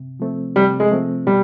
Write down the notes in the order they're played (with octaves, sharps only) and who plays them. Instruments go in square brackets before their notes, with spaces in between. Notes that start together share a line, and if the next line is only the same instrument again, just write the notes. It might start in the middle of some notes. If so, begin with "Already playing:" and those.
Already playing: [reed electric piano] C3
F3 A3 C4
[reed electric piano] C3 [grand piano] G3
[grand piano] G#3
[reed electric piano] F3 A3 C4
[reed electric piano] B2 [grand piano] G3